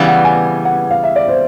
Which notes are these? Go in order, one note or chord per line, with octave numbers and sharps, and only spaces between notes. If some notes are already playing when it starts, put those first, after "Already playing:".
Already playing: C#3 E3 G3 B3 F5
F#5
G#5
F#5
F5
E5
D5
C5